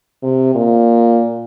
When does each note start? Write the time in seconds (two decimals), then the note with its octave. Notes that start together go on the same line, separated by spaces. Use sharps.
0.23 C3
0.55 A#2